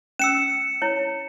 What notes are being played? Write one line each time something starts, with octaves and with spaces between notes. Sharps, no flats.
C#4 E6 C#7 E7
E4 C#5